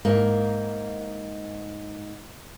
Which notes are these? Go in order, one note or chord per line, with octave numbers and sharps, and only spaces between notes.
G#2 A#3